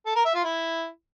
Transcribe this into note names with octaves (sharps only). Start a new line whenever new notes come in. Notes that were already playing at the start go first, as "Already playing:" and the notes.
A4
A#4
E5
F4
E4